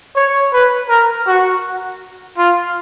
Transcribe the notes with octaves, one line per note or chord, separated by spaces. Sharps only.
C#5
B4
A#4
F#4
F4